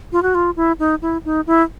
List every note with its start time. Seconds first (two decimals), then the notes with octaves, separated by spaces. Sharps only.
0.12 F4
0.23 F#4
0.35 F4
0.56 E4
0.79 D#4
1.02 E4
1.25 D#4
1.47 E4